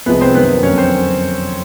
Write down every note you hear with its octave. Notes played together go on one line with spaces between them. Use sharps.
C2 C3 F3 G#3 B3 B4
C4 C5
F#2 D#3 F#3 A#3 B3 B4
F2 D3 F#3 A#3 C#4 C#5
C4 C5